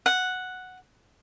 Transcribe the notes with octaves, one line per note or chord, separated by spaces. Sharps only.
F#5